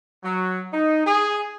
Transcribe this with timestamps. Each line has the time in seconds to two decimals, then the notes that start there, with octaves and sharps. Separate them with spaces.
0.24 F#3
0.73 D#4
1.06 G#4